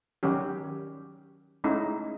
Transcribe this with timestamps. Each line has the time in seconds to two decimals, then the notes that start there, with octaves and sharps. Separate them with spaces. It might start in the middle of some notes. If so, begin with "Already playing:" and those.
0.23 D#3 F#3 G3 C#4 G4
1.64 G#3 A3 C#4 D#4 E4